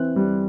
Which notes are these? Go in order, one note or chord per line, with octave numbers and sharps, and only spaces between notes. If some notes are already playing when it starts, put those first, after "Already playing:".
Already playing: E3 C4 F#6
G3